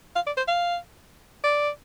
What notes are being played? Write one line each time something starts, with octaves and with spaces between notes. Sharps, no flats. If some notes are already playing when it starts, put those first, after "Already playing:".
F5
D5
C5
F5
D5